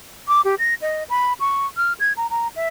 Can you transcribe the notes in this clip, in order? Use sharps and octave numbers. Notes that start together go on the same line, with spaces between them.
D6
G4
A#6
D#5
B5
C#6
F6
G#6
A#5
A#5
E5